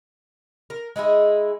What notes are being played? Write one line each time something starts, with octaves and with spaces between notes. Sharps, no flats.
A#4
G#3 D#4 E4 G#4